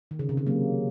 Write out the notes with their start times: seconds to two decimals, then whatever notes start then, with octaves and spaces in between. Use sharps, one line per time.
0.11 D#3
0.19 C#3
0.29 C3
0.37 C#3
0.46 F#3 A#3